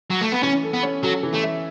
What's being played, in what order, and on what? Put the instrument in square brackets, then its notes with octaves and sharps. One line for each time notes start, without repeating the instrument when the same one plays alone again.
[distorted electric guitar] F#3
A3
B3
[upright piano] E3 [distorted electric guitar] C#4
[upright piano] A4
[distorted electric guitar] B3
[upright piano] C#4
[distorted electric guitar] F#3 [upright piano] A4
[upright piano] E3
[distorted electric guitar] A3
[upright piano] E5